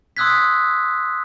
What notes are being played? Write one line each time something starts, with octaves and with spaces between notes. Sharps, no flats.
C6 D#6 E6 F#6 G#6 B6